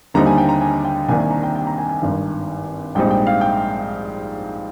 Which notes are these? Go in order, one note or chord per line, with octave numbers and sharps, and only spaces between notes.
D#2 D3 G3 C4 D#4 A#5
G#5
G5
A#5
G#5
G5
C2 C3 D#3 A#3 D4 G#5
G#5
A#5
G5
G5
A#5
G#5
G#5
G#1 G2 D#3
A#1 G#2 G3 C4 D#4 G5
G5
F5
G5